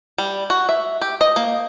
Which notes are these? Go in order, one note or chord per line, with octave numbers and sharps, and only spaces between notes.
G3
F#4
E5
G4
D#5
A#3